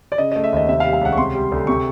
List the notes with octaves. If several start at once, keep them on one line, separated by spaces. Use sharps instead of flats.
D5
C#3 D#5
A3 D#5
E5
D#2 D#5
C3 E5
F5
G3
F5
C#2 F#5
C#6
C3 C6
G3
D2
C3 C#6